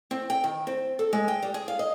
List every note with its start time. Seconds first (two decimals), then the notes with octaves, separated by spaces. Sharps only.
0.11 C4
0.30 G5
0.44 D#3
0.67 C4
0.99 A4
1.13 G#3
1.28 G5
1.42 G3
1.54 G#4
1.68 F5
1.79 D#5